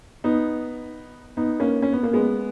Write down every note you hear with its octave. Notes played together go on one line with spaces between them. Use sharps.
B3 D#4
B3 D#4
A#3 C#4
C#4
B3
A#3
G#3 B3